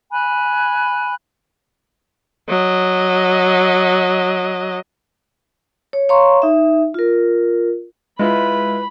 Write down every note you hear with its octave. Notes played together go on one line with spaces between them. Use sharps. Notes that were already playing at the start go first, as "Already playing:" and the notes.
G#5 B5 F#6
F#3 D#5
C#5
C#5 F5 A#5 C6 C#6
D#4 E5
F4 A#4
G#3 E4 F4 B4 B5